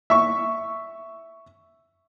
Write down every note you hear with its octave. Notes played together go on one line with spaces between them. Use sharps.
E5 C#6